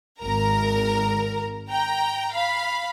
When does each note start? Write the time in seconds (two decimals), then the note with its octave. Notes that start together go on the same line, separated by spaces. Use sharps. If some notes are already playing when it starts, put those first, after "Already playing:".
0.21 G#1 A#4 A#5
1.70 G5 A#5
2.33 F5 B5